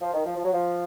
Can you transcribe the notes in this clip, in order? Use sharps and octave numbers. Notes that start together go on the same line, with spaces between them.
F3
D#3
F3
F3
F#3
F3